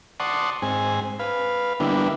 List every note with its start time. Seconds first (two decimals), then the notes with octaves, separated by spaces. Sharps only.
0.20 D5 F#5 A5 C6 C#6 D#6
0.62 G#2 C4 G#5
1.19 B4 F5
1.80 D3 G3 A#3 B3 D4 E4